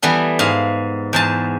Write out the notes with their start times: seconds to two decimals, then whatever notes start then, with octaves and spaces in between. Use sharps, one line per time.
0.02 E3 G3 B3 A4
0.39 G#2 F5
1.13 E2 G#2 A5